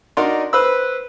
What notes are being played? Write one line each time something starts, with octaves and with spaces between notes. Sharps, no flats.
D4 D#4 F#4 A#4 D5 C6
B4 C5 B5 E6